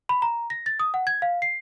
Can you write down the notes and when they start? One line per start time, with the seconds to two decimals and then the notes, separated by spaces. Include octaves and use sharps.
0.09 B5
0.22 A#5
0.50 A#6
0.66 A6
0.79 D#6
0.94 F#5
1.07 G#6
1.22 F5
1.42 C7